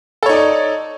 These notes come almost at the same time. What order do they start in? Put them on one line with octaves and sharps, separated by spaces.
A4 C#5 D#4 D5